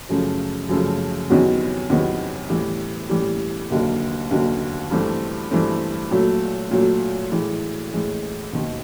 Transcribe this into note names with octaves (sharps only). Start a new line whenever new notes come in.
F#2 C#3 F3 A3
F#2 C#3 F3 A3
E2 C3 D#3 F#3 B3
E2 C3 D#3 F#3 B3
A2 E3 G3
A2 E3 G3
F1 D#2 D3 F#3 A#3
F1 D#2 D3 F#3 A#3
G2 E3 A3 C4
G2 E3 A3 C4
A#2 F#3 A3
A#2 F#3 A3
A2 E3 G#3
A2 E3 G#3
E1 D#2 D#3